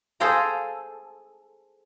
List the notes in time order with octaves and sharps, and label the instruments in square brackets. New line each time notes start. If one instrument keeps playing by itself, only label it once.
[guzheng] G#4 A4 C5 F5 G5 A#5